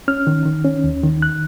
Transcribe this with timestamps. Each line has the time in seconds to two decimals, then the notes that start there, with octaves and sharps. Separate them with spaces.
0.08 C#4 F6
0.27 D#3
0.46 D#3
0.65 C#4
0.84 D#2
1.03 D#3
1.22 F#6